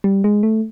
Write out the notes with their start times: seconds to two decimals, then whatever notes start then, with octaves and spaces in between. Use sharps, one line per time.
0.04 G3
0.24 G#3
0.43 A3